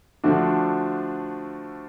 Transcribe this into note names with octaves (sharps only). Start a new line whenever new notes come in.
D3 F3 A3 D4 F#4